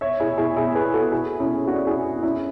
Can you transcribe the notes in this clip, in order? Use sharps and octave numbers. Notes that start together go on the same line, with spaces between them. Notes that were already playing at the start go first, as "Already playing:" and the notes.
C#5 E5
E4 G#4
E4 G#4
E4 G#4
G#4 B4
F#4 A4
E4 G#4
C#4 E4
D4 F#4
E4 G#4
C#4 E4